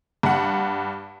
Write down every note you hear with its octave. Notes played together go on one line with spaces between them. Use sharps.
G2 F#5